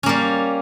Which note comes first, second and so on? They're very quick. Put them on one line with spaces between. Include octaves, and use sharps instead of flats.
C#4 A#3 G3